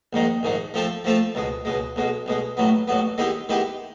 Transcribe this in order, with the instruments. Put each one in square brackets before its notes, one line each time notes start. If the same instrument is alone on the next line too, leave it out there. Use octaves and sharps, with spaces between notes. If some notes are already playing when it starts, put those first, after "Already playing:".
[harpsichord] A#1 G#2 D#3 G#3
A#1 G#2 D#3 G#3
F3 A3 C4 F4 A4
F3 A3 C4 F4 A4
C#2 B2 G#3
C#2 B2 G#3
B1 B2 G#3
B1 B2 G#3
A1 A2 F#3 B3
A1 A2 F#3 B3
D#3 G#3 B3 E4 G4
D#3 G#3 B3 E4 G4